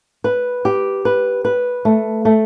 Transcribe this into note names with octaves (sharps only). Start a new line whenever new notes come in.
B4
G4
B4
B4
A3
A3